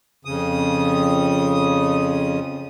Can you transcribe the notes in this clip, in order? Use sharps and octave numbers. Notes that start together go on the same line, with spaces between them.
F2 C#3 D#6